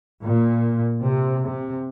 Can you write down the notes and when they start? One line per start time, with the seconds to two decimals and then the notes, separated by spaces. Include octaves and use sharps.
0.21 A#2
1.02 C3
1.43 C3